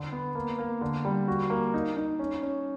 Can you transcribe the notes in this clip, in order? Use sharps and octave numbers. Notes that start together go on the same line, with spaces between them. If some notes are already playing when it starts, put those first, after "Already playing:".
Already playing: D3
B3
A#3
A#3
D3
G3
F#4
A#3
D#4
D#4
C#4
C#4